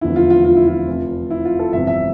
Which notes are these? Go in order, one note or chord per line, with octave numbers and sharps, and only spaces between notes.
F1 E2 D3 F3 E4
F4
F4
F4
E4
F4
F1 F2 E3
E4
F4
A4
G1 F2 C3 E3 E5
E5